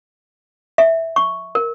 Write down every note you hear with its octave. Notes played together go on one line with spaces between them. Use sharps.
E5
C#6
A#4